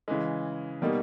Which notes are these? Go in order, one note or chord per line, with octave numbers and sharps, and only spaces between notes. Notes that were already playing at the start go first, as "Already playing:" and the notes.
C#3 E3 G#3
B2 G3 A#3 D#4